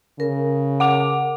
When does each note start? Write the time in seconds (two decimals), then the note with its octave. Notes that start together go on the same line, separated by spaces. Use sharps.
0.20 C#3 A#4
0.80 F#5 D6 F7